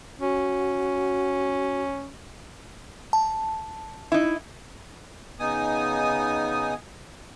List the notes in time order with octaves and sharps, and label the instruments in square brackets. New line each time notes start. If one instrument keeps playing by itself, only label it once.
[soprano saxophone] C#4 [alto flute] F#4
[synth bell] A5
[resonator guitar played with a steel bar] D#4 E4
[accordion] C#3 B3 D#4 G#5 D#6